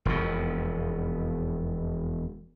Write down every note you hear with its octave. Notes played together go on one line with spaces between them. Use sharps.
E1 F2 B2